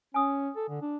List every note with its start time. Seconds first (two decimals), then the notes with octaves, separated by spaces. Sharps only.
0.14 C#4 G#5 D#6
0.56 A4
0.69 D3
0.82 D4